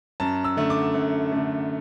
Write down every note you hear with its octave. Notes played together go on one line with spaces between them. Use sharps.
F#2 A5
E6
D3 A3
D6
F#2
D3 A3